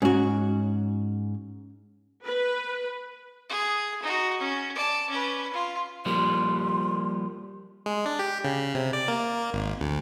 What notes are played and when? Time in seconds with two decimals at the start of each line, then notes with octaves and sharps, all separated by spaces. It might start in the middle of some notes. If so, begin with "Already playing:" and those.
0.02 G#2 C#4 F#4
2.25 B4
3.49 G#4
4.03 D#4 F#4
4.40 C#4
4.75 D5 A5
5.10 C#4 B4
5.53 F4
6.06 F3 G3 A#3 C6
7.86 G#3
8.06 D4
8.19 G4
8.44 C#3
8.75 C3
8.93 D5
9.08 A#3
9.53 G#1
9.80 D2